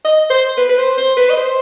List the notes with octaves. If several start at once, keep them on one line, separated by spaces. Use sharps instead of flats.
D#5
C5
B4
B4
C5
C5
B4
D#5
C5